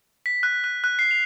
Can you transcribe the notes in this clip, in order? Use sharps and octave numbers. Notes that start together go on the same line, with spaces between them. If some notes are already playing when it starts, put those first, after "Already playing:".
B6
F#6
F#6
F#6
C7
F7